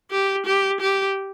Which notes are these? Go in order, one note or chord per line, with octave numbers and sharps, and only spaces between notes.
G4
G4
G4